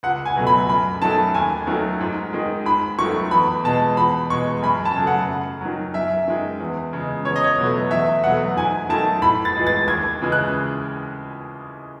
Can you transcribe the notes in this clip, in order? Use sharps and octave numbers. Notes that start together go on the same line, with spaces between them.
C#2 F#5
G#5
B2 F#3 A3
B5
F#2 B5
D#3 F#3 A3 A5
D#2 G#5
D#3 F#3 A3
G#2
D#3 G#3
G#2 B5
D#3 F#3 A3 C#6
E2 B5
B2 G#3 A5
E2 B5
B2 G#3 C#6
F#2 B5
A5
C#3 F#3 A3
F#5
F#2
D#3 F#3
F#2 E5
D#3 G#3
E2
C#3 G#3
E2 C#5
D#5
C#5
B2 F#3 A3
E2 E5
B2 F#3 A3 F#5
G#2 G#5
D#3 F#3 A3 A5
A2 B5
A6
E3 G#3
A6
D#2 G#6
C#3 E3 G#3
F#6